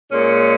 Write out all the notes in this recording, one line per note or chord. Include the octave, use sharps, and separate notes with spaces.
A#2 G#3 C#4